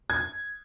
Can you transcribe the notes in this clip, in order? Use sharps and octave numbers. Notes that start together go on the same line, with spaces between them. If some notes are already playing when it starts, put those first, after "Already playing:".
G#6